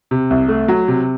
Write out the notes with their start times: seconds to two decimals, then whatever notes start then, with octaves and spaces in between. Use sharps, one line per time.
0.11 C3
0.30 C2
0.48 A3
0.68 F#3
0.88 C3